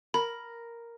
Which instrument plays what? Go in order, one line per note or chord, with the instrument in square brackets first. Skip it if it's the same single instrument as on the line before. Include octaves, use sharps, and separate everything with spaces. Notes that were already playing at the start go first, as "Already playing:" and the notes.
[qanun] A#4 [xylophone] B5